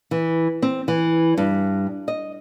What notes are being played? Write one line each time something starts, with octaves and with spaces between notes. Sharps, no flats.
E3
C4
E3
G2
D#5